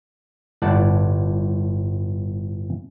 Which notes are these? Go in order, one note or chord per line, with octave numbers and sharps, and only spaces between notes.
G1 A2 D5 F#5 A5